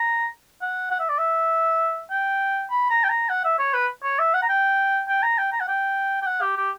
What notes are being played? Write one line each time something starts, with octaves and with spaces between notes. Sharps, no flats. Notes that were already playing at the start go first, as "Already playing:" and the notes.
Already playing: A#5
F#5
F#5
E5
D5
E5
G5
B5
A#5
G5
A#5
F#5
E5
C#5
B4
C#5
E5
F#5
A#5
G5
G5
A#5
G5
A#5
F#5
G5
G5
F#5
G4
G4